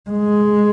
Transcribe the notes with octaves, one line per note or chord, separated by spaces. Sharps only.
G#3